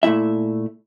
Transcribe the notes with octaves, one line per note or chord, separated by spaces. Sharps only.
A#2 A3 C#4 E4 E5